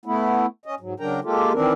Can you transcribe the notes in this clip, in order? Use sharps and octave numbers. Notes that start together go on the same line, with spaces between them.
A3 B3 E4
C#4 D#5
G#2 F#3
C#3 F#3 D4 A#4 G5 A#5
G#3 A#3 F4 G4 A4
D#3 E3 C4 D4 A#4